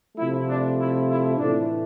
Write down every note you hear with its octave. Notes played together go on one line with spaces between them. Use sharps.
C3 F3 A3 E4
D4
E4
E4
A2 E3 A3 D4